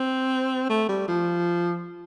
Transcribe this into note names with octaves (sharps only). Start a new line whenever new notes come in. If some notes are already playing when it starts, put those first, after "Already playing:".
Already playing: C4
A3
G3
F3